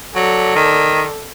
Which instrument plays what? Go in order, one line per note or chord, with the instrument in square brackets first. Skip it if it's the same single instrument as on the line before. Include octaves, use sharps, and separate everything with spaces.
[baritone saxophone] F#3 [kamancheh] A4 D5
[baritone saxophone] D#3